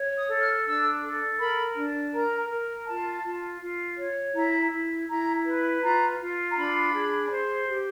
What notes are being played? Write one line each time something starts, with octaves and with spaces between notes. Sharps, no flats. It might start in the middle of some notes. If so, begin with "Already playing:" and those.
Already playing: C#5
D#6
A4
F6
D4 E6
A4
A#4 B5
D4
A#4 A#5
A#4
F4 A5
F4
F4
C#5
E4 A#5
E4
E4 A#5
B4
F4 A#5
F4
A#5
D4 B5
G#4
C5
G4